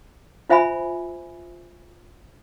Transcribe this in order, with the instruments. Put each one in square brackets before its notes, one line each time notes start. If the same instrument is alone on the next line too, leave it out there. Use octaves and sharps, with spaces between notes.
[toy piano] F4 C5 E5 G#5 B5